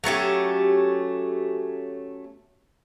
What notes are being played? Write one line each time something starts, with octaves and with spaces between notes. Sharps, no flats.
F#3 A3 C#4 G4